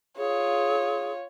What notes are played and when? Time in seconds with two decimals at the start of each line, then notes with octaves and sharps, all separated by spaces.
0.18 F4 G#4 C#5